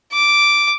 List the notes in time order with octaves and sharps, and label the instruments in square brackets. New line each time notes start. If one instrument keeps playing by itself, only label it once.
[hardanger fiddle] D6